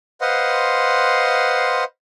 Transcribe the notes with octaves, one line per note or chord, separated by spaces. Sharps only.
B4 C5 D#5 F5 F#5 C6